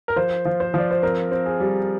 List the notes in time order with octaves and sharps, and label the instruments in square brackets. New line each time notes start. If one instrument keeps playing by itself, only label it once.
[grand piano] A#4
F3 C5
F3
C5
F3 D5
C5
C4 A#4
C4
G#4
G3